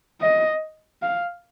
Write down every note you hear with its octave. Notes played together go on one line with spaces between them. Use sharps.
D#5
F5